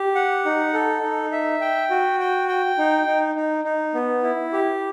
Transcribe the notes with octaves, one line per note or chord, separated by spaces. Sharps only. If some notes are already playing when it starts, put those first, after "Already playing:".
Already playing: G4
F#5
D#4
A4
D#4
E5
G5
F#4
G5
G5
D#4
D#4
D#4
D#4
B3
E4
G4